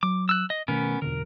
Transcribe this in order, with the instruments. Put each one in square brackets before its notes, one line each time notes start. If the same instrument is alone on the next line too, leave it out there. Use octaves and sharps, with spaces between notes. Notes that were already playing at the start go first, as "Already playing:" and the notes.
[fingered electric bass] F#3 [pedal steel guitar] D6
[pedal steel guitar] E6 F#6
D#5
[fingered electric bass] B2 D#3 A3 [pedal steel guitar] B3 C#4 A#4
[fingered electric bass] E2 B2 D3 [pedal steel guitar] A#4